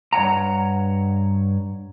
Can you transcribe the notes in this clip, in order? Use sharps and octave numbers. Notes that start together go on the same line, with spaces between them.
G2 C#5 F#5 A#5